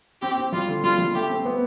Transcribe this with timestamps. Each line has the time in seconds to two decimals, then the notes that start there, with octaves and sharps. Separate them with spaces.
0.22 C4 G4
0.38 C4
0.52 G3 F4
0.68 D3
0.84 G3 F4
0.99 G3
1.14 A3 G4
1.30 C4
1.45 B3